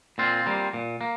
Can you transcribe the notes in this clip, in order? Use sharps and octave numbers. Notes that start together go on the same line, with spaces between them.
A#2 C4 F4
G3 A#3
A#2
A#3